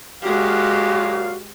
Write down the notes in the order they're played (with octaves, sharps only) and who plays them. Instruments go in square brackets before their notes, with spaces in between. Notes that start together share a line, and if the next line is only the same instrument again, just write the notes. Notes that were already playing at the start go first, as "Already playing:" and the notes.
[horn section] F#2 A#2 F5 [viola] G#3 G4 [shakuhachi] F#4